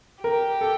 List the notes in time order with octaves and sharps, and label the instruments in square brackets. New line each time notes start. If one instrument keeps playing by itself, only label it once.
[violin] G4 [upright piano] A#4
[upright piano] A4